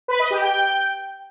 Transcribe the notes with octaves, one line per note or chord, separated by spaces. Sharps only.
B4
D#5
G4
G5